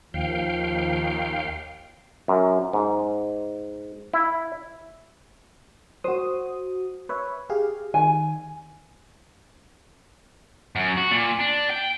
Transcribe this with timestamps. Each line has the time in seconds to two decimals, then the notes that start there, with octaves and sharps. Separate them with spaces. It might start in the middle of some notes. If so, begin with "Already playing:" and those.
0.14 D#2 F3 F5 G5
2.28 F#2
2.73 G#2
4.13 E4
6.04 F#4 C5 D#6
7.09 B4 C#5 E5
7.50 G4 G#4 F5
7.94 D#3 G#5
10.76 F#2
10.98 F#4
11.12 A#2
11.40 D4
11.71 G5